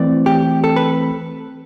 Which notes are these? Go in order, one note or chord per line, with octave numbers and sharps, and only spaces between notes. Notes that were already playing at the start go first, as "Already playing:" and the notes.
Already playing: E3 A3 C4 D5
G4
A4
B4